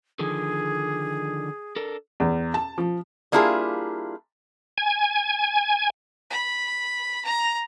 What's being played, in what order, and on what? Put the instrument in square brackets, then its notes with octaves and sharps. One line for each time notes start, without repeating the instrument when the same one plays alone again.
[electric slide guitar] D3 D#3 F3 [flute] G#4
[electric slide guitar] D4 A4 A#4
[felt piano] E2
A5
F3
[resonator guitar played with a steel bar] G3 A#3 D4 E4 F4 G#4
[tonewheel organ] G#5
[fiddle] B5
A#5